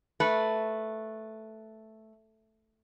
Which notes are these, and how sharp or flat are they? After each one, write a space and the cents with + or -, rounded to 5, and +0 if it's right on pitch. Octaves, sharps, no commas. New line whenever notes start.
A3 +0 B4 +0